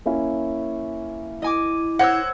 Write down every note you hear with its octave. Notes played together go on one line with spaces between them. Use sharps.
A#3 C#4 E4
E4 D#5 G#5 D6
C5 C#5 F#5 D6 E6 G#6 A#6